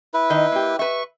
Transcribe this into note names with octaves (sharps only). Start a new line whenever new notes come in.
E4 B4
D#3 D#5
A#3 G4
B4 E5 C#6